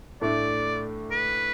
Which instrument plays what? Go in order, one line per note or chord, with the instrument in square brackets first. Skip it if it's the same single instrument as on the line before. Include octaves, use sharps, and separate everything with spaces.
[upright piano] A2 A3 D4 [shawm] D5
[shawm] B4